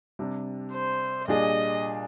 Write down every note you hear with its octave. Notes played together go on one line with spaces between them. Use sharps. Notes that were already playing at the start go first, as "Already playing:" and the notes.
C3 G3 D4
C5
A#2 G3 D4 G#4 D#5